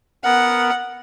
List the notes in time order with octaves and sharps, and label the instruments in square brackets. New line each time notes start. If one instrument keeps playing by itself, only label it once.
[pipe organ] B3 A#4 [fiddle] F#5